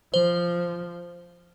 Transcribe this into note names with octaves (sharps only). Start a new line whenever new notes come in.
F3 C5